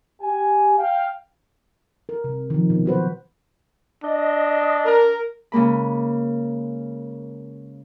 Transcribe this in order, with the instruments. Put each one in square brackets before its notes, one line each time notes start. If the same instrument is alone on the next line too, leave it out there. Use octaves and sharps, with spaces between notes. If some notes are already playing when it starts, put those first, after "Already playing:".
[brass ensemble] G4 G#5
F5 G5
[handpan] A#4
C3
D#3 F3
B2
F#3 F#4 B4 C5
[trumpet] D4 [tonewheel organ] D#5
[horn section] A#4
[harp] C#3 G#3 A#3 B5